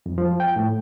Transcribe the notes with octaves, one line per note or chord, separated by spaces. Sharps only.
F2
F3
G5
A2